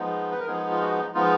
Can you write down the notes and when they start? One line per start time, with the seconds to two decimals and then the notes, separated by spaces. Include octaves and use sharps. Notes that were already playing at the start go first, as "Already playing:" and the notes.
Already playing: F3 G#3 B3 D#4
0.32 B4
0.40 A#4
0.47 F3 G#3 B3 D#4 G#4
0.71 F4
0.82 F#4
1.14 F3 G#3 B3 D#4 F4